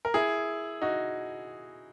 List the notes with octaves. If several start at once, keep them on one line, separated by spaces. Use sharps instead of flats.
A#4
E4 G#4
D#4 F#4